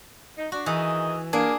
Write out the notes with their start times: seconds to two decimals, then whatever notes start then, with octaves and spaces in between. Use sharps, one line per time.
0.38 D#4
0.52 D4 F#4
0.66 D#3 E3 G#4 D#5
1.33 A#3 D4 G#4